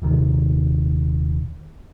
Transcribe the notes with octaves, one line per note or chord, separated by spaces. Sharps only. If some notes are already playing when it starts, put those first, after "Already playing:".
D#1 C3 D#3